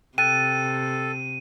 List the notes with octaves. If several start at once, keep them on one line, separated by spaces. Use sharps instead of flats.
C3 A4 G5 F#6 A6 D#7